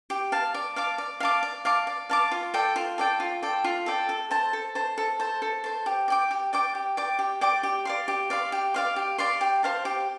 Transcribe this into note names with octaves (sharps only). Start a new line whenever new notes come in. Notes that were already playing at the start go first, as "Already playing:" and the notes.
G4
F5 A5
D5
F5 A5 D6
D5
F5 A5 D6
D5
F5 A5 D6
D5
F5 A5 D6
F4
A4 D5 G5
F4
A4 D5 G5
F4
A4 D5 G5
F4
A4 D5 G5
A4
C5 A5
A4
C5 A5
A4
C5 A5
A4
C5 A5
G4
D5 G5 D6
G4
D5 G5 D6
G4
D5 G5 D6
G4
D5 G5 D6
G4
D5 F5 C6
G4
D5 F5 C6
G4
D5 F5 C6
G4
D5 F5 C6
G4
C5 F5 A5
G4